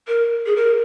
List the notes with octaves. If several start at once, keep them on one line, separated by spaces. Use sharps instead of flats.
A#4
G#4
A#4